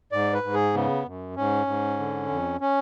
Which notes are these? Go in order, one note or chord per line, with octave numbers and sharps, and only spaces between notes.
G#2 D5
B4
G#2
G#4
C#3 B3
F#2
G#2 C#4
G#2
D3
F2
C#4